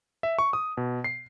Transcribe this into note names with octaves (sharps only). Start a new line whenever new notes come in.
E5
C#6
D#6
B2
C7